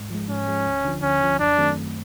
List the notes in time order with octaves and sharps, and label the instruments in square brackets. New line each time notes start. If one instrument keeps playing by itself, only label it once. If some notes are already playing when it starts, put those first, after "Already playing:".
Already playing: [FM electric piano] G#2
F3 G#3
[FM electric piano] G#2 [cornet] C#4
[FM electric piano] F3 G#3
D2
D3 F3
[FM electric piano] D2 [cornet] C#4
[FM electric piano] D3 F3
[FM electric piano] F#2 [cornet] D4
[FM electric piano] D#3 F#3 A3 C4
F#2